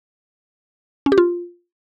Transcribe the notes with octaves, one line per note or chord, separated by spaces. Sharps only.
C#4
G4
F4